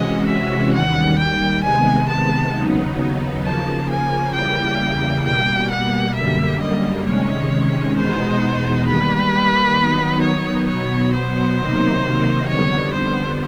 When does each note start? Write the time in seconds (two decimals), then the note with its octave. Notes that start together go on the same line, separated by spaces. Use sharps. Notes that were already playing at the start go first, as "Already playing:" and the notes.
Already playing: C3 E3 G#3 C#4 F#4 D#5
0.27 E5
0.73 D#2 D#3 G3 F#5
1.19 G5
1.63 C3 D#3 G#3 B3 G#5
2.09 A5
2.54 D#2 C#3 F#3 B3 D#4
3.44 C#3 F3 A#3 A5
3.90 G#5
4.34 E2 C#3 E3 G3 A#3 G5
5.24 B2 G3 A#3 G5
5.70 F#5
6.15 F#2 D3 G3 A#3 E5
6.61 D#5
7.06 C3 D#3 G#3 C#4 C#5
7.96 E2 B2 G#3 B3 D#4 C5
8.87 D#3 G3 A#3 B4
9.76 D#3 F#3 B3 D#4
10.22 C#5
10.67 B2 F#3 B3 C#5
11.13 C5
11.57 C3 D#3 F#3 A#3 D#4
12.48 F2 D3 G3 B3 C#5
12.93 C5